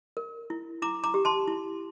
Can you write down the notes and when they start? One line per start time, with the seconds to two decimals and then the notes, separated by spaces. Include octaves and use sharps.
0.17 A#4
0.50 E4
0.82 E4 A#5 D6
1.04 A#5 D6
1.14 G4
1.25 A5 C6
1.48 E4